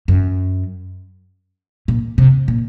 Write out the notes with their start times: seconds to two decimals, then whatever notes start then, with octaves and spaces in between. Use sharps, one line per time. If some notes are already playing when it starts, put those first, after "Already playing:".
0.08 F#2
1.88 A#2
2.18 C3
2.48 A#2